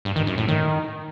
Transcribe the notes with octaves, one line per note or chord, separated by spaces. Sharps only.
G2
D#3
F#2
A2
D#3